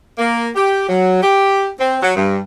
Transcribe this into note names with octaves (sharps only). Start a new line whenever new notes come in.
A#3
G4
F#3
G4
C4
F#3
G2